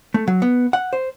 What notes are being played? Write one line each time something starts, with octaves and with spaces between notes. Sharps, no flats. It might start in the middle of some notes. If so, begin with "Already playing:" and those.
A3
F#3
B3
F#5
C5